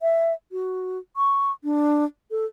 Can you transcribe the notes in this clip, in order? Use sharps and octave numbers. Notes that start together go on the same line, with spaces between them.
E5
F#4
C#6
D4
A4